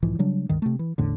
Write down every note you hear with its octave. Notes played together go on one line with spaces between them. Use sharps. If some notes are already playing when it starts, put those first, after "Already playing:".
B1 G#2 E3 F3
C#3 F#3 G3 D4
C#2 G2 D#3
C3 A3
E3
A1 E2 A2 D3